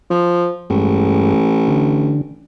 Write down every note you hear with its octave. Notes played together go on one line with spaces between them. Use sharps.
F3
A1 G2 G#3
D3